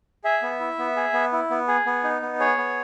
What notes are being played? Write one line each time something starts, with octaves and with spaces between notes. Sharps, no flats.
G#4 E5
B3
E4
B3
G#4
B3
E4
B3
G#4
B3
D#4
B3
G#4 C#5
B3